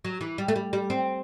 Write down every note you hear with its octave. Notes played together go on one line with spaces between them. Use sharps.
F#3
E3
G3
A3
G3
G3
C4